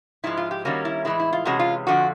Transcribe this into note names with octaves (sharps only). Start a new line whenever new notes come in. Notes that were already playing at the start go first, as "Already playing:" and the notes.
G#2 F3 G#3 E4
F4
G4
D#3 G3 A#3 C#4 F#4
E4
A2 E3 G#3 E4
E4
F4
C3 E3 G#3 C#4 F#4
F4
F2 D3 F3 F#4